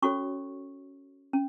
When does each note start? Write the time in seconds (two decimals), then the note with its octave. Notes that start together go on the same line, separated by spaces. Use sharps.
0.02 C#4 F#4 A4 C#5 C#6
1.33 C#4